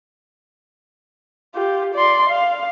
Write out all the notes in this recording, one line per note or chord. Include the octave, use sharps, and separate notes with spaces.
F4 G4
D5 C6
F5